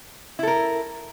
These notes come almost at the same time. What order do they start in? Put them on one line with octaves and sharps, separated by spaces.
E4 A4 A#4